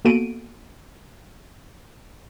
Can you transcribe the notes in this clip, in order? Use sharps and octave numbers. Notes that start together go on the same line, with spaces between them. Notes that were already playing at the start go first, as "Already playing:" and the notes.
A#3 B3 F#4 A4 D7 D#7